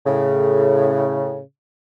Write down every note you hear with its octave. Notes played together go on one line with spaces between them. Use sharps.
A2 C#3